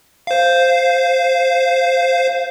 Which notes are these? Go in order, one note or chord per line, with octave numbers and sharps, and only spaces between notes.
C5 F5